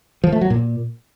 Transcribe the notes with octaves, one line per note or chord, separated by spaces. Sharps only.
F3
A3
F#3
A#2